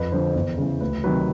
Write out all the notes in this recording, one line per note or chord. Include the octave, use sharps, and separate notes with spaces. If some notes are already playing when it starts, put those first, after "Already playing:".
Already playing: F2 B4
D3 F3 C5
E2
C#3 E3
D2 B4
C3 D#3 F#3 B4